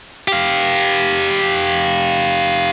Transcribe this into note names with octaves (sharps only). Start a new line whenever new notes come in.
G4 F5